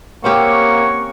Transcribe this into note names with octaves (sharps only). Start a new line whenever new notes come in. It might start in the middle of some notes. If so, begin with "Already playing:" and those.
A#3 C4 C#4 G4 C#5 F#5 C#6